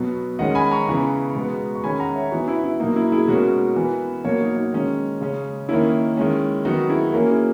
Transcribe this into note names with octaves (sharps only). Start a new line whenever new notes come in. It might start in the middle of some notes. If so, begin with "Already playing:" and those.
Already playing: B2 F#3 B3
D#3 G#3 C#4 D#5 F#5
G#5 B5
A#5 C#6
C#3 E3 B3
B2 G#3 B3
C#6
D#3 G#3 C#4 G#5 B5
F#5 A#5
C#5 E5
E3 B3 D#4 F#4
E4
E4
B2 F#3 A#3 D#4
E4
E4 G#4
B2 G#3 C#4 F#4 A#4
E3 B3
B2 F#3 A#3 A#4 C#5
D#4 F#4
D#4
D#3 G#3 C#4
C#3 G#3 C#4
D#3 A#3 C#4 E4
D#3 G#3 C#4
D#3 F#3 B3 D#4 F#4
E4 G#4
E3 A#3 C#4 F#4 A#4
E4 G#4